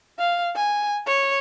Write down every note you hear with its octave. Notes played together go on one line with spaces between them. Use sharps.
F5
G#5
C#5